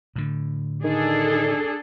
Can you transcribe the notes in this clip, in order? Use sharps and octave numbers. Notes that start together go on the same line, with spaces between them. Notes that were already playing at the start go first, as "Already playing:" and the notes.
A2 D3
D#3 D4 G#4 A4